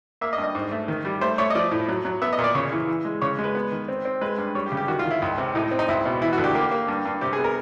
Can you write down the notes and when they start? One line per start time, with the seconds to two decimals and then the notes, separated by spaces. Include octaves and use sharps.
0.21 A#3 E5
0.33 D#5
0.38 G2
0.44 D#5
0.55 G#2
0.72 A3
0.88 D#3
1.05 G3
1.21 A3 C5
1.38 A3 C#5
1.50 D#5
1.55 F3 D5
1.71 A2
1.88 F#3
2.05 F#3
2.22 B3 E5
2.33 D#5
2.39 A#2
2.44 D5
2.55 C#3 C#5
2.72 E3
2.88 E3
3.05 G#3
3.22 C#3 C#5
3.39 G#3
3.44 B4
3.55 B3
3.72 D#3
3.88 C4
4.05 C4
4.21 G#3 B4
4.38 G2
4.55 G3 C#5
4.66 G4
4.72 C#3
4.77 G4
4.88 D#3 F#4
4.99 F4
5.05 D#3
5.11 E4
5.22 C#2
5.38 C3
5.55 A2 D#4
5.71 C4
5.79 D#4
5.88 C#2 E4
6.05 B2
6.22 E3 E4
6.33 F#4
6.38 D2
6.44 G4
6.55 A#3 G4
6.71 A#3
6.88 G2
7.05 G2
7.21 C3 G4
7.33 G#4
7.39 B3
7.44 A#4